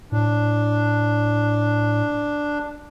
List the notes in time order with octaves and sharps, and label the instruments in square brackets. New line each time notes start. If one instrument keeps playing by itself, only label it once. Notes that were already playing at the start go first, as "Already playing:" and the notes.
[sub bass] A2 [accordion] D4